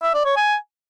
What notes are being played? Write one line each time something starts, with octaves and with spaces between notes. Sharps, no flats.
E5
D5
C#5
G#5